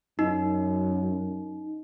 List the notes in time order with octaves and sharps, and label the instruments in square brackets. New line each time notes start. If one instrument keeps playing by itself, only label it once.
[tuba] F#2 [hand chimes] D#4